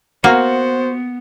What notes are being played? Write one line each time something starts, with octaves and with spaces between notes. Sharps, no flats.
A#3 B3 F#4 C5